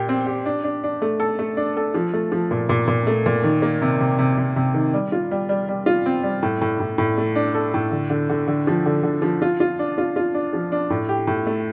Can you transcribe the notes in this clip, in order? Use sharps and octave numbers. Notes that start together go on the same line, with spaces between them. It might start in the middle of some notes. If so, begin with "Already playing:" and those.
Already playing: A#2 G4
C4
G4
D4
D4
D4
A3
A4
A3
D4
A4
F3
A3
F3
A#2
A#2
A#2
A3
A#2
D#3
A#3
C3
C3
C3
C3
C3
D#3
G3
F4
G3
G3
G3
F4
C4
G3
A2
A2
A2
A2
A3
D4
A4
A2
D3
D3
D3
D3
F3
D3
D3
F3
F4
F4
D4
F4
F4
D4
F3
D4
A2
G4
A2
A3